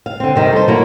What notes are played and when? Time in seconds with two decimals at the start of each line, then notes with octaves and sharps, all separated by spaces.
0.06 F5
0.20 D3 C4
0.36 C3 D#3 G3 C4
0.53 A4 C5
0.68 F#3 A#3 E4